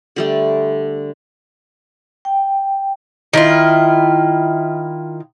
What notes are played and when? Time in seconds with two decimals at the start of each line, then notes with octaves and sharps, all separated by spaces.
0.16 D3 G3 A3
2.25 G5
3.33 D#3 E4 F4